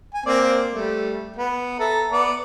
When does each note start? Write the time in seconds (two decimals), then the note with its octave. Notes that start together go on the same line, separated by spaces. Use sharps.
0.14 G#5
0.26 A#3 C4 D5
0.73 G3 A3
1.36 B3
1.79 A4 E5 A#5
2.12 B3 D5